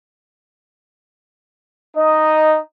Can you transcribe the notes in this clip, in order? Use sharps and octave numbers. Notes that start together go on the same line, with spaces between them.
D#4 D#5